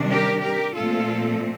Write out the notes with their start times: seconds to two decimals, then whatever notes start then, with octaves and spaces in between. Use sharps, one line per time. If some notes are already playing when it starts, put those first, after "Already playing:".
Already playing: C3 D#3 G3 D4
0.10 G4 A#4
0.42 G4 A#4
0.74 A#2 F3 A3 C4 F4 A4